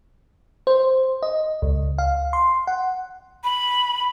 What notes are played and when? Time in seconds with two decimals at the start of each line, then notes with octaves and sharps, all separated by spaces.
0.67 C5
1.23 D#5
1.62 C#2
1.98 F5
2.33 C6
2.67 F#5
3.44 B5